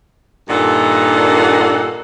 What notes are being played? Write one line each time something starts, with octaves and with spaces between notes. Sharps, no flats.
G2 A#2 D#3 A4 F#5